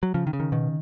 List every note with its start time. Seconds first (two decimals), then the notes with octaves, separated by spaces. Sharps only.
0.03 F#3
0.14 C#3 F3
0.27 D#3
0.33 C#3
0.40 D#3
0.52 B2 D#3